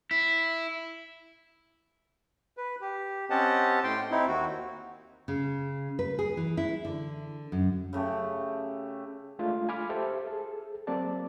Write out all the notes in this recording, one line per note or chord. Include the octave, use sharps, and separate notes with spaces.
E4
B4
G4
C4 C#4 G4 D#5 F#5 A5
A2 G5 C6
C4 D#4 E4
D#2 F#4
C#3
B4
G#4
E3
E4
D3
F#2
C#3 A3 G4
G#3 A3 D4 F4 F5
G#5 B5 D6 F6
G4 A4 C5 E5
G#4 A4
F#3 A#3 C4 D5 A5